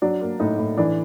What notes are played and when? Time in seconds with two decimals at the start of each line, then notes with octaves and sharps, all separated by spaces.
0.02 F#3 D4
0.21 A#3
0.40 A2 D#4
0.58 A2
0.77 E3 D4